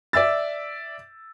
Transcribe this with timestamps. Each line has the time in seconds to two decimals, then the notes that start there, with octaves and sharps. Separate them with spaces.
0.13 D5 E5 E6 A6